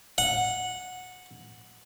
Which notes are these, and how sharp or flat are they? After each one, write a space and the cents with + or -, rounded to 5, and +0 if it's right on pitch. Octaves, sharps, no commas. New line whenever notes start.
F#5 -10